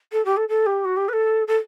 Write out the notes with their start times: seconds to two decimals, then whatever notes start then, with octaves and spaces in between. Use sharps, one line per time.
0.12 A4
0.25 G4
0.37 A4
0.49 A4
0.66 G4
0.85 F#4
0.97 G4
1.09 B4
1.13 A4
1.47 A4